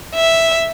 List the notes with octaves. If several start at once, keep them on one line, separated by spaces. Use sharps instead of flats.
E5